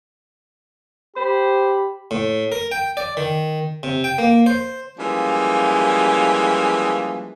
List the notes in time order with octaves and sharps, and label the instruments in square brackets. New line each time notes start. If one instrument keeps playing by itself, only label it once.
[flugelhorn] G4 [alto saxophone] C5 [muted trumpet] B5
[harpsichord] A2
A#4
G5
D5
D#3
C3
G5
A#3
C5
[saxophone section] E3 F3 G3 G#3 A#3 C#4